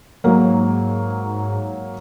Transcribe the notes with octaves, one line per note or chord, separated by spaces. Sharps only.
G#2 F#3 A#3